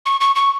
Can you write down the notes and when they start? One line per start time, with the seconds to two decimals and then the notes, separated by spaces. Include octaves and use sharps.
0.06 C#6
0.21 C#6
0.36 C#6